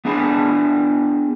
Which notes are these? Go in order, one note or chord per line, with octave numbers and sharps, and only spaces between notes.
B3 D4 G#4 G#5 A5 B5